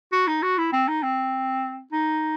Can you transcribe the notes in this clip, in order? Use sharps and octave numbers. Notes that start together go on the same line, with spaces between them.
F#4
D#4
F#4
E4
C4
D#4
C4
D#4